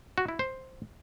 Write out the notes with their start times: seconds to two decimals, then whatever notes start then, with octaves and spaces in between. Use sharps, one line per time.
0.18 F#4
0.28 E4
0.39 C5